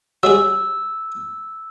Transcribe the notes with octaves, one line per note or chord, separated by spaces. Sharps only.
F#3 G3 G#4 E6